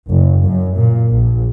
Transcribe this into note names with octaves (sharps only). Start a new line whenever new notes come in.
F#1
F#2
A#2
A#1